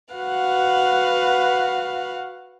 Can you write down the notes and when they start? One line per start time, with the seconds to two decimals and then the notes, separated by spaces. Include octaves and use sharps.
0.14 F#4 B4 F5 F#5